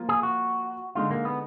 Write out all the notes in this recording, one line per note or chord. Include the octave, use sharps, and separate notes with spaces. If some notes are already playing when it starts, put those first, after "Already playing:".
Already playing: F3 A#3 F4
G#4
F#4
D3 G#3 D#4 F4
A#3
B3